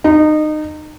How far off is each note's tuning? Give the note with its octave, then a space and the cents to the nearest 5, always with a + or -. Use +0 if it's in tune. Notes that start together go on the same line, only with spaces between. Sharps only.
D#4 -25